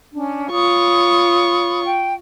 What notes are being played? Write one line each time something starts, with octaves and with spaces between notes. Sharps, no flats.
C#4 D4
F4 C#5 B5 C#6 D#6
G5